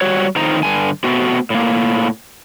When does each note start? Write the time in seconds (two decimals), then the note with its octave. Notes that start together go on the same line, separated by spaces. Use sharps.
0.01 G3 F#4 C#5
0.36 A2 D#3 F3 C4 D#4 A#5
0.63 G2 D3 G#5
1.04 A3 B3 C4 F#4
1.50 A2 A#3